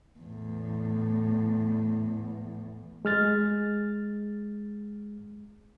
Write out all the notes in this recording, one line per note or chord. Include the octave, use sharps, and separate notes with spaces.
E2 A2
G#3 F6 A6